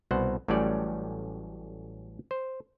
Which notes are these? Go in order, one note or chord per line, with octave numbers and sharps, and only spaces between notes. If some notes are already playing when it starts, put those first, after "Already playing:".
C2 B2 C5 F#5
A1 A2 F#3 G3 C#4 D5
C5